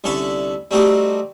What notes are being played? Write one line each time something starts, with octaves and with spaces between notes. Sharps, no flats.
C2 D3 C#4 A4 E5 B5
G3 A3 C4 D#4 F#4 G4